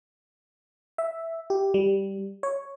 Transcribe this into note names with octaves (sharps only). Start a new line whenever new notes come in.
E5
G4
G3
C#5